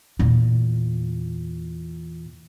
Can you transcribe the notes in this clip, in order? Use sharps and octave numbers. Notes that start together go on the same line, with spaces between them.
E2 A#2